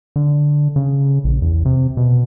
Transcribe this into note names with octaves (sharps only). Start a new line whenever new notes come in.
D3
C#3
A#1
E2
C3
B2